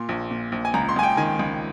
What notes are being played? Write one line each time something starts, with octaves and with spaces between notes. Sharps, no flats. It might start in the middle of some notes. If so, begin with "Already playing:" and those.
Already playing: A#2 C6
A#1
A#2
A#1
G#5
C#2 A#5
C6
C#2 G#5
G5
D#3 G#5
C#2